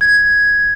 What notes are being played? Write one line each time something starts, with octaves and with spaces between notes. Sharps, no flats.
G#6